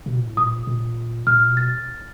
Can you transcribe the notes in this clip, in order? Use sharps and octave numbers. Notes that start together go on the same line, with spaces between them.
B2
A#2
A2
A#2 D#6
A#2
A#2 F6
B2
A6